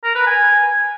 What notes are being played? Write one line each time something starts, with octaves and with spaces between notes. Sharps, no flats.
A#4
B4
G#5